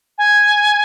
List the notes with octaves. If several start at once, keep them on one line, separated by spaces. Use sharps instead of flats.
G#5